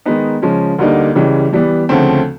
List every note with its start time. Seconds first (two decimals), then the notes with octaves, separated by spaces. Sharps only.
0.05 D#3 G#3 B3 D#4
0.42 C#3 F3 G#3 C#4
0.79 D2 D3 G3 A#3 D#4
1.15 C#2 C#3 E3 G3
1.53 E3 G3 B3
1.89 D2 C#3 F3 A3 C4